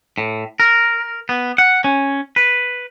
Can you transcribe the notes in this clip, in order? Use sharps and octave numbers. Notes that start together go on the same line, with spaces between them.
A2
A#4
B3
F#5
C#4
B4